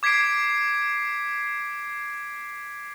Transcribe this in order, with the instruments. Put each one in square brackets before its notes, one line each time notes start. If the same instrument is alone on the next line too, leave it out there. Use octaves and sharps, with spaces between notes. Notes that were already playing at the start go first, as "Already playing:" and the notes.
[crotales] D6 G#6 B6 C7 D7